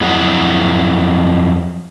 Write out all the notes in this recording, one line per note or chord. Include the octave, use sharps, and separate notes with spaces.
F2 F#3 E4 G#4 F#5